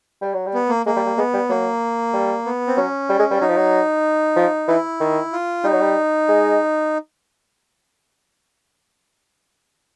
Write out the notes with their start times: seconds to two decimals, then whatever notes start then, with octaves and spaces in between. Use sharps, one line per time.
0.22 G3
0.34 F#3
0.46 G3
0.54 B3
0.69 A#3
0.86 G#3 A#3
0.96 G3
1.07 G3
1.17 G#3 B3
1.33 G3
1.49 F#3 A#3
2.13 G3
2.46 B3
2.67 C4
2.76 F#3 C#4
3.09 G3
3.19 G#3
3.31 G3
3.41 F#3 D#4
3.49 F3
3.56 F#3
4.36 F3
4.68 E3 E4
5.00 D#3
5.33 F4
5.64 G3 D#4
5.72 F#3
5.80 G3
6.29 G#3